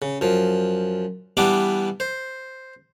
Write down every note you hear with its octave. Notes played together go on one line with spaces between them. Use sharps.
C#3
F#2 F3
E3 G3 B3 D4 E4 D6
C5